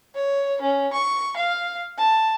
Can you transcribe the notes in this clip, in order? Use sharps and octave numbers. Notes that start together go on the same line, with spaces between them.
C#5
C#4
C#6
F5
A5